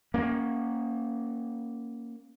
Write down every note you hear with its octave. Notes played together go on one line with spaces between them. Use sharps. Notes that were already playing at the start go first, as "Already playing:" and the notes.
A#3 C#4